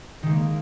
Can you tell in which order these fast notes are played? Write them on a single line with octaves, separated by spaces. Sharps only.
D#3 G#3 A#3